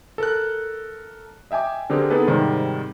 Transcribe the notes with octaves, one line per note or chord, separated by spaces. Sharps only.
A4 A#4 F#6
D#5 E5 G5 G#5 D6
D3 C4 G4 G#4 A#4
B3 D#4 G#4 A4 B4
G#2 C3 D#3 G3